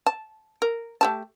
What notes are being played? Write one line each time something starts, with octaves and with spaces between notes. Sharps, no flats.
A5
A#4
A3 G4 A5